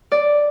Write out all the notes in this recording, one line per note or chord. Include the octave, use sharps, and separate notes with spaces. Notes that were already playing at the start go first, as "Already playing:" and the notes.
D5